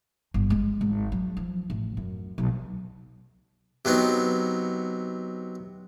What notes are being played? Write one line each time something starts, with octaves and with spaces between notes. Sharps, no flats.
G1
G#3
G#1
F#3
F3
A1
F#2
B1
C3 F#3 B3 D#4